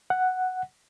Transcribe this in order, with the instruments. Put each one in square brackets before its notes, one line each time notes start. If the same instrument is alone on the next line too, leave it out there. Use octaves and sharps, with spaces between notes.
[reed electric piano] F#5